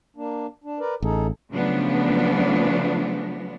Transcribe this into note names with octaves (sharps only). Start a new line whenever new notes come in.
A#3 D4
D4
A#4 B4 D5
A1 D#4 G#4 A4
C#3 F3 F#3 A3 B3 D4